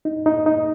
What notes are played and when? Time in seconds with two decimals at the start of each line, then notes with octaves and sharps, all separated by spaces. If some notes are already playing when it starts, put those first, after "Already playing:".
0.05 D#4
0.26 D#4
0.46 D#4